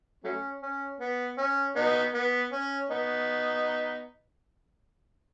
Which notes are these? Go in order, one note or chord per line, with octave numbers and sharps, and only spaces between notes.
F#3 A3 C#4
C#4
B3
C#4
B3 D#4
B3
C#4
B3 D#4